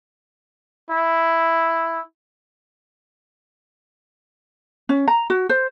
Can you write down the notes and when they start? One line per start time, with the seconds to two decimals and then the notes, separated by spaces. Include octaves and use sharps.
0.90 E4
4.89 C#4
5.08 A#5
5.30 F#4
5.49 C5